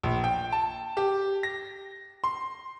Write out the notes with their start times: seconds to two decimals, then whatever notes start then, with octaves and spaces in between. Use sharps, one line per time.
0.03 A#1
0.24 G5
0.52 A5
0.97 G4
1.43 A#6
2.24 C6